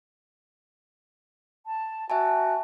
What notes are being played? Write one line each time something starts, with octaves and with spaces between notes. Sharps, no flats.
A5
F#4 E5 G#5 A5